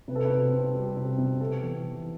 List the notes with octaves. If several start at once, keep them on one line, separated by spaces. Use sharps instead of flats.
C3 B4
A4
B4
C3
C4
G3
C3
C3
B3 A4
E3
E3